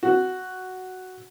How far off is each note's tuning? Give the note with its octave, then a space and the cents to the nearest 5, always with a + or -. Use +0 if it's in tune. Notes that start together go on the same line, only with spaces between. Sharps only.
F#4 +5